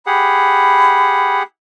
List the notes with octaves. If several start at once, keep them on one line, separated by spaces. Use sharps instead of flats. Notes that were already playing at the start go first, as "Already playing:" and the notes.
G4 G#4 F#5 B5